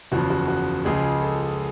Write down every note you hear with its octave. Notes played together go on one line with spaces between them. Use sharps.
F#1 E2 C#3 F3 F#4
F#4
F#4
C#2 C#3 F3 G#3 G#4
A4